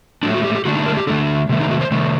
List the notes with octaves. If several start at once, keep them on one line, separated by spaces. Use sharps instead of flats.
A2 F#3 A3 D4
F#4
G4
G4
D3 A3 D4 F#4
D#4
A#4
G4
D3 A3 D4 A4
C3 D#3 A3
D#4
F#4
C5
C3 D#3 A3